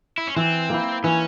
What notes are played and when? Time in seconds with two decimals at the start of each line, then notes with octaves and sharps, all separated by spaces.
0.18 E4
0.27 C#4
0.36 E3 C4
0.70 A#3 E4
1.04 E3 C#4